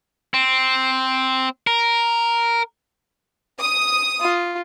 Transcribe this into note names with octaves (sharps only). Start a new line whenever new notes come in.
C4
A#4
D#6
F4